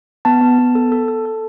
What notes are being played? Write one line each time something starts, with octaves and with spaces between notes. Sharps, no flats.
B3 A5
B3
B3
A4
A4
A4
A4